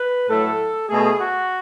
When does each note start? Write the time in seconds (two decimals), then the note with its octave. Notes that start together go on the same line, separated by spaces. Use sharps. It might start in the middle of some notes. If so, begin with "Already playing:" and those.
Already playing: B4
0.28 A2 F#3 A3 A4
0.88 B2 A3 G#4
1.18 F#4